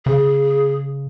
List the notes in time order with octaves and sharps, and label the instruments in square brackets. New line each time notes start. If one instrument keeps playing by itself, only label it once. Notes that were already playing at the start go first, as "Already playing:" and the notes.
[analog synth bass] C#3 [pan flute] G#4